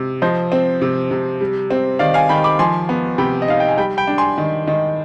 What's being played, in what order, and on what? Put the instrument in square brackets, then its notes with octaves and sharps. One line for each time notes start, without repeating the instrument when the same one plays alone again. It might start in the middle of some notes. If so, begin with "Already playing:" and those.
Already playing: [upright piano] C3
[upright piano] F3 [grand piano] C5 D#5
[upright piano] C4
C3
C3
G3
C4
[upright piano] D#3 [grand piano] D5 F5
[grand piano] F5 G#5
[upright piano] D#3 [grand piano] G5 B5
[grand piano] B5 D6
[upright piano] F3 [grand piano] G#5 C6
[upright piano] B3
[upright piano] C3 [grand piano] G5 B5
[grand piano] D#5
[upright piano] D#4 [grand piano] F5
[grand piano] G5
G#5
[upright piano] G3 [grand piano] G5 B5
[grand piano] G5 B5
[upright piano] D4
[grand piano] G#5 C6
[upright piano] D#3
D#3